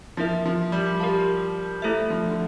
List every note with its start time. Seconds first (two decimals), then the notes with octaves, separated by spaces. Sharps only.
0.17 F3 A#3 E4 A#4 E5
0.46 F3
0.72 G3
1.00 G4 A#4 F5 A5
1.82 G3 A3 E4 A4 C5 E5
2.10 F3
2.28 D3